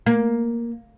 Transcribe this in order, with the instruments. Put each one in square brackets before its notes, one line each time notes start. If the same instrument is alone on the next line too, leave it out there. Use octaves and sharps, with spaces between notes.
[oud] A#3